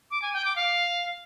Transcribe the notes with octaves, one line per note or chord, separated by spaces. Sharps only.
D6
G#5
G5
D6
F5